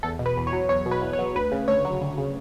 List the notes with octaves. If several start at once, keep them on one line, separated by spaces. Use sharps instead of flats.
E2 A4
B2
B4
E2
C#5
F#3
E2 C#5
B2
B4
E2
C#5
F#3
D2 B4
C#3
D2 C#5
F#3
D2
C#3